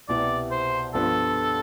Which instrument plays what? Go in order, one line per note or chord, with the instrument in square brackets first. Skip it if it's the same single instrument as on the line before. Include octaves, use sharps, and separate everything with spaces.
[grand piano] C2 B2 B3 E4 G4 [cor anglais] D5
[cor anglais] C5
[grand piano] G2 F3 B3 F4 [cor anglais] A4